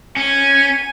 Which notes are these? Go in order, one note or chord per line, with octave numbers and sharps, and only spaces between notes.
C#4 G#5